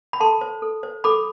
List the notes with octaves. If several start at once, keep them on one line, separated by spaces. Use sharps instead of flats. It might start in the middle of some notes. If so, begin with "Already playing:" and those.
B5
A4 A5 C6
C5
A4
C5
A4 B5 D6